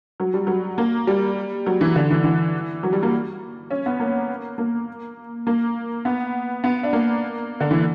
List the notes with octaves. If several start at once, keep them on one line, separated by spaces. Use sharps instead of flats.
F#3
G3
F#3
A#3
G3
F#3
E3
D3
E3
E3
F#3
G3
A#3
C#4
B3
A#3
A#3
A#3
B3
B3
D4
A#3
D3
E3